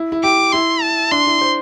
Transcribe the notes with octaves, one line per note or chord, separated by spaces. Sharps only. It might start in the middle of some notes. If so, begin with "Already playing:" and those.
Already playing: E4
E4
G4 D6
E4 C6
A5
D4 C6
E4
C5